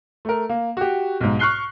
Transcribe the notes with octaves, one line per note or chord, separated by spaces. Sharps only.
A3 A#4
A#3
F#4 G4
B1 G#2
C#6 F6 F#6 C7 G7